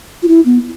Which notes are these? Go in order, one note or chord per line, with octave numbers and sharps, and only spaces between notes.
F4
E4
B3